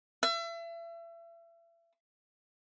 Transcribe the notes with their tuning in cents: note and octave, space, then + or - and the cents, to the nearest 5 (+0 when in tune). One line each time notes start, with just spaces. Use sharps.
E5 +35